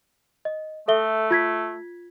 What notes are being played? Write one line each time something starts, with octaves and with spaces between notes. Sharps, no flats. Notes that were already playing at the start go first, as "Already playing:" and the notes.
D#5
A3 A4 E5 G7
F4 G#6 B6